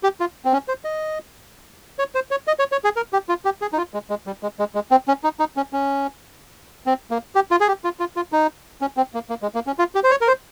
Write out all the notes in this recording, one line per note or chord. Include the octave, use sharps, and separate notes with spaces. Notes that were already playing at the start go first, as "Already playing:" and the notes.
G4
F4
C4
C#4
C5
D#5
C#5
C5
C#5
D#5
C#5
C#5
G#4
A#4
G4
F4
G4
G#4
D#4
F4
G#3
G#3
G3
G#3
G#3
G#3
C4
C#4
D#4
D#4
C#4
C#4
C4
A#3
G4
F4
G#4
G4
F4
F4
F4
D#4
C#4
C4
A#3
A#3
G#3
A#3
C#4
F4
G4
C5
C#5
A#4
C5